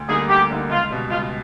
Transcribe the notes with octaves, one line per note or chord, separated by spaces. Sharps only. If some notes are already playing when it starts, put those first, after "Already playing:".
Already playing: D2
D3 G3 A#3 D#4 G#4
D2 G4
D3 G3 A#3 D#4
C#2 F4
B2 G3
C#2 F4